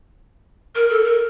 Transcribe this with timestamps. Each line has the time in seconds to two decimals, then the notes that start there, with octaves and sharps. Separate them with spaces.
0.75 A#4
0.89 A4
1.04 A#4